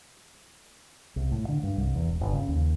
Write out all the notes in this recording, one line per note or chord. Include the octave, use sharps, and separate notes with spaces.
C2
A2
D3
G2
C2
E2
E1
G1
C#3
D#2